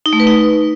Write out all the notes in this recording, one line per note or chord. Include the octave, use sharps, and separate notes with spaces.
D#4
A3
B4
D#4